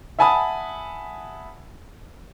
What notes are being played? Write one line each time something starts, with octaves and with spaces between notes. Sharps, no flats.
E5 F#5 G#5 A5 B5 D#6